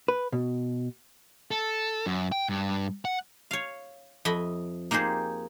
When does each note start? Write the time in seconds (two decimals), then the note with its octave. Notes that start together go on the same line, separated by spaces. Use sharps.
0.08 B4
0.32 B2
1.51 A4
2.06 F#2
2.32 G5
2.49 G2
3.05 F#5
3.51 C#5 F5
4.25 F2 D#5 E5 B5
4.91 A#3 D#4 G4 G#4 C5